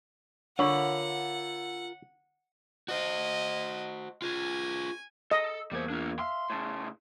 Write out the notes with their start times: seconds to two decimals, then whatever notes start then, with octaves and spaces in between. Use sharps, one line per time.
0.59 D3 F4 A#4 C#5 F#5 B5
2.88 F#4 C5 D#5
4.22 F4 G#4 G#5
5.31 A4 D#5
5.72 E2 G3 A#3 C5 G#6
5.90 D4 F4
6.19 E5 F5 C6
6.50 A2 C#3 A5 C6